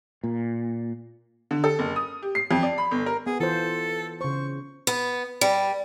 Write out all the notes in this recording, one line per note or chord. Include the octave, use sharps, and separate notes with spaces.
A#2
D3
A4
F#1
D#6
G4
C7
F2
D5
B5
G1
A#4
B3 G#4
E3 F4 A4 C5
C#3 C5 C#6
B3
G3